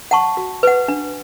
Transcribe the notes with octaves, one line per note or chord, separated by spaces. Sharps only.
F#5 A5 C#6
F#4
B4 F#5
D4